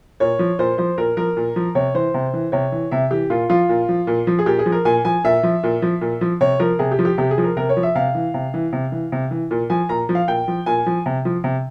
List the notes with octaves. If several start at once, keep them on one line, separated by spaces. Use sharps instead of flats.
A#2 C#5
F3
A#2 C5
F3 C5
A#2 A#4
F3 A#4
A#2
F3
C3 C#5
E3 C5
C3
E3
C3 C#5
E3
C3 E5
E3 G4
A#2 F4
F3 F4
A#2
F3
A#2
F3
G#4
A#2 G4
G#4
F3
A#4
A#2 G#5
F3 G#5
A#2 E5
F3
A#2
F3
A#2
F3
C3 C#5
F3 A#4
C3 G#4
G4
F3
G4
C3 G4
G#4
F3
A#4
C3 A#4
C#5
F3
E5
C3 F5
E3
C3
E3
C3
E3
C3
E3
A#2
F3 G#5
A#2 A#5
F3
F5
A#2 G5
F3
A#2 G#5
F3
C3
F3
C3